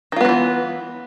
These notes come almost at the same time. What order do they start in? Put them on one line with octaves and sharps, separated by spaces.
D#3 F4 B3 F#3 E3